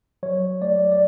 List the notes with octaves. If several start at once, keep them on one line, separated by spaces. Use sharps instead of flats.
F#3 C#5
A3 D5
D5